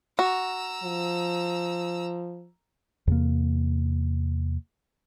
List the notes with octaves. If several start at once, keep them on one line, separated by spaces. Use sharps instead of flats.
F#4 A#5 E6
F3
E2 C3 A#3